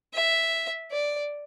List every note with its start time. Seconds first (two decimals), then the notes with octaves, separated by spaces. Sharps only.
0.14 E5
0.91 D5